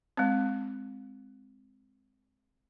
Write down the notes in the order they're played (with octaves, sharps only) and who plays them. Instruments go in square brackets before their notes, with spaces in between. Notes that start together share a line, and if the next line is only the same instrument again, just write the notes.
[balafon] G#3 C4